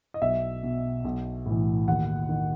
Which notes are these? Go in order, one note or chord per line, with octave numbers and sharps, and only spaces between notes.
D#5
B1 E5
B2
B1
A2 E3
D#2 F#5
D#3